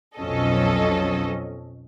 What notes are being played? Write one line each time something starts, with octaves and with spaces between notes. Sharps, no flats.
B1 F2 F#3 C#4 A4 D#5